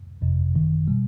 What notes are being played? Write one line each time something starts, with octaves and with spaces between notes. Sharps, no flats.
G1 F2 C3
G#1 F#2 D#3
B2 G3